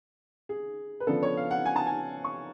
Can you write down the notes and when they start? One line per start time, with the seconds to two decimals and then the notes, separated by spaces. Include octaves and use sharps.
0.49 G#4
1.00 B4
1.07 C#3 F3 B3 D4 A4
1.23 C#5
1.37 F5
1.51 F#5
1.65 G#5
1.76 A5
1.86 G#5
2.24 C#6